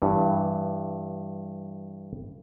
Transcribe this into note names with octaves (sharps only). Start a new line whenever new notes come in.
G2 E3